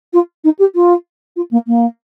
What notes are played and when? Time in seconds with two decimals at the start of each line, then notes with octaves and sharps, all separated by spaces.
0.13 F4
0.43 D#4
0.58 G4
0.74 F4
1.36 F4
1.50 A#3
1.66 A#3